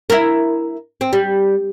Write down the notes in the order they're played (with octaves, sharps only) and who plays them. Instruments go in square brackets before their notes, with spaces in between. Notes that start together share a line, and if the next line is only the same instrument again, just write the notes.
[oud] E4 A#4
C4
G3